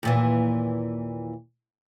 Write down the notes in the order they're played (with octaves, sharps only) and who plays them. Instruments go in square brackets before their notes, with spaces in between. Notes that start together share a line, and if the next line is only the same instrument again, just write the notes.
[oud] D#2 A#2 E3